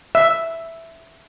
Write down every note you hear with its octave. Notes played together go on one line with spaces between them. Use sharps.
E5